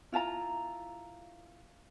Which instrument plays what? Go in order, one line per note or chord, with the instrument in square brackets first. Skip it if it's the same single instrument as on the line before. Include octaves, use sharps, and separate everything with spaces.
[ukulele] E4 F4 A5 A#5